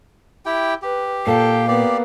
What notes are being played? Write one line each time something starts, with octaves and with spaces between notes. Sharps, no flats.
E4 G4 G5
G4 B4
A#2 A4 F5 G5
A#3 B3 G4 D5